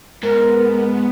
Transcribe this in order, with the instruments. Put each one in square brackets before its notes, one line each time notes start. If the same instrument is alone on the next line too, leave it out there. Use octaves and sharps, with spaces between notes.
[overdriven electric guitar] G#2 [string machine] B3 [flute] A#4